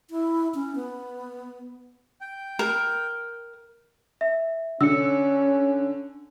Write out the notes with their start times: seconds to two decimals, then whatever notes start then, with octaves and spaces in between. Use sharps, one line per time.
0.10 E4
0.54 C#4
0.75 B3
2.21 G5
2.59 A#4
4.21 E5
4.81 D3 C#4 E6 C#7